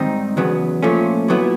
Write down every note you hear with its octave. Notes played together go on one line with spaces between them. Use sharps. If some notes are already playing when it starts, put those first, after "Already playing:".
Already playing: G#2 D#3 G3 C4 D#4
E2 C#3 F#3 B3
A#2 F3 A3 C#4
A#2 F#3 B3 E4